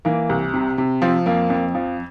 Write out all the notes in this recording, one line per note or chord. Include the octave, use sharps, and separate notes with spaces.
E3 A#3
C2
C3
C3
F3 C4
F2 A#3
F2
F3